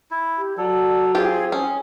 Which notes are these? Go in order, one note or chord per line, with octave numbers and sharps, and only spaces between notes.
E4
G4
F#3 A4 D5
C4 F4 G4 G#4
C#4 D#6